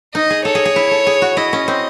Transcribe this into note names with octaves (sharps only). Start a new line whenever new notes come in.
D#4 D#5
G#4
A4 C#5
G#4
G#4
E4
A4
G#4
F#4
E4 D#5
C#4
C4